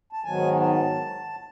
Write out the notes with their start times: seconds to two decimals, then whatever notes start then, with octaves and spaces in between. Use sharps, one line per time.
0.13 A5
0.24 G#2 D#3 F#3 B3 G#5
0.60 A5